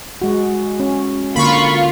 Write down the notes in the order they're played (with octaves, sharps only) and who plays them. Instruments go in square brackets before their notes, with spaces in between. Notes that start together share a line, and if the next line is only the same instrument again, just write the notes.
[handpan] G#3 F#4
C#4
[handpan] D3 A#3 [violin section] F4 [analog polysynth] B5 C#6